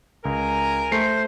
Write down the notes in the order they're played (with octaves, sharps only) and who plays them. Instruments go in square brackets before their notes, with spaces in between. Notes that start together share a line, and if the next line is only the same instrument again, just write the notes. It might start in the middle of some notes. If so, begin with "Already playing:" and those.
[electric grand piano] C#2 [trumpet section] A#4 G#5 A#5
[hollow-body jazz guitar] A3 [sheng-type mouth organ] C5 [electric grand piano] C7